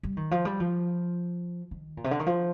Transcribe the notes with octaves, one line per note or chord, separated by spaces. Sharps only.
G3
D#3
F3
G3
F3
D#3
A#2
C3
D3
D#3
F3